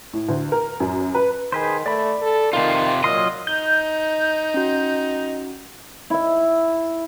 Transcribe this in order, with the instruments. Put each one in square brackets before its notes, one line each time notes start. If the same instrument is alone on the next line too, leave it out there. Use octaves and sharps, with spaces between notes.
[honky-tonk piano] A2
D2
A#4
F#2
B4
[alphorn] D#3 [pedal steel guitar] G#4 B4 C5
[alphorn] A3 [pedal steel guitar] D5 B5
[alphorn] A4
[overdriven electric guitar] C3 F4 [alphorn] D#3
[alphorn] A#2 [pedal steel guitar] F#3 F4 C6 [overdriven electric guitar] D#5
[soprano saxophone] D#4 [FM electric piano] G6
[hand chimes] C#4 F#4
[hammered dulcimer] E4 E5